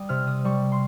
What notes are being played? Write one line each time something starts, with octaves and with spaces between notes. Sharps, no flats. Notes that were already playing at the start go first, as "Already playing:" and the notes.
Already playing: G3 D#6
C3 F6
D#6
G3 C#6
C6